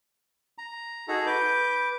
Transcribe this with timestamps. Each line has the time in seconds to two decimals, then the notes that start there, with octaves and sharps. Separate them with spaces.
0.58 A#5
1.08 D#4 F#4 G#4 A4 A#5
1.26 B4 D6 G6